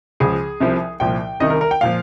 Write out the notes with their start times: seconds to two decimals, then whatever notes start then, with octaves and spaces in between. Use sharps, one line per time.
0.20 C#2 C#3 F3 G#4
0.60 C2 C3 F3
1.00 C2 A#2 F3 G5
1.40 C2 C3 D#3 D#5
1.50 A#4
1.61 A#4
1.71 G5
1.81 A#2 F3 F5